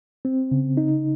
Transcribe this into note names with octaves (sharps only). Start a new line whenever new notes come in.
C4
C#3
D#4